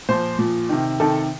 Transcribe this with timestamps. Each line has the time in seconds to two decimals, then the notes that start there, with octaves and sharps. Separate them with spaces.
0.09 A#2 F3 C5
0.39 A#2 F3
0.69 C3 D#3
1.00 C3 D#3 A4